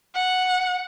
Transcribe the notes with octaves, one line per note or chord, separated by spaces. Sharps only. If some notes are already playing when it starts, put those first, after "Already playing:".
F#5